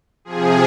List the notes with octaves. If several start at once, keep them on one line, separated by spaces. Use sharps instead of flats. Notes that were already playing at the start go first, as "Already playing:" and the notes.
C3 F3 G#4